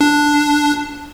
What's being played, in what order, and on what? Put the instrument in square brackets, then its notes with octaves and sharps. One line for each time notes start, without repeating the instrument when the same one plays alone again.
[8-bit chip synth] D4